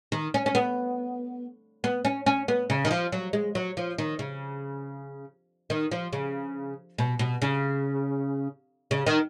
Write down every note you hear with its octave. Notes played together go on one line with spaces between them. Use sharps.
D#3
C#4
C#4
B3
B3
C#4
C#4
B3
C#3
D#3
F3
F#3
G#3
F#3
F3
D#3
C#3
D#3
F3
C#3
B2
B2
C#3
C#3
D#3